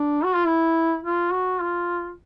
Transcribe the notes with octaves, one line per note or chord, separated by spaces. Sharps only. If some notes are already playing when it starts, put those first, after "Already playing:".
Already playing: D4
F#4
F4
E4
F4
F#4
F4